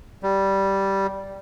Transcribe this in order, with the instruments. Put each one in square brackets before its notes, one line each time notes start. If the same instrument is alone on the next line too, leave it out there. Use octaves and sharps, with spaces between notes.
[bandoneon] G3